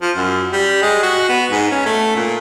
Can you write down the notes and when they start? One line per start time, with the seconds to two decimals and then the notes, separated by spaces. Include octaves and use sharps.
0.02 F3
0.16 F#2
0.53 G3
0.82 G#3
1.03 F#4
1.29 B3
1.51 G#2
1.71 C#4
1.86 A3
2.16 A#2